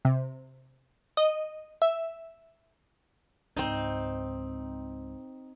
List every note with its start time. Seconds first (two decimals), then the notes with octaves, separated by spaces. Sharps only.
0.05 C3
1.17 D#5
1.82 E5
3.56 C#2 G#2 C4 D#4